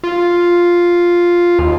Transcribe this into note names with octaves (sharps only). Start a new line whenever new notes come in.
F4
D#2